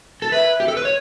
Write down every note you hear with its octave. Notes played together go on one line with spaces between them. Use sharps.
A4
B4 E5
G4
A4
B4
C#5